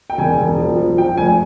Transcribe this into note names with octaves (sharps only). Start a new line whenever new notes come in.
G5
E1 G#5
E1
F3
F3
F3 G5
F1 G#5